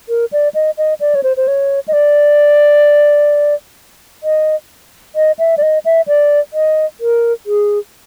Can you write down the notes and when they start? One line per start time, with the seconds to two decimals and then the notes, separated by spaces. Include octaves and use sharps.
0.09 A#4
0.32 D5
0.54 D#5
0.78 D#5
1.00 D5
1.15 C#5
1.23 C5
1.37 C5
1.48 C#5
1.88 D#5
1.93 D5
4.23 D#5
5.16 D#5
5.39 E5
5.58 D5
5.62 D#5
5.85 E5
6.08 D5
6.53 D#5
7.00 A#4
7.46 G#4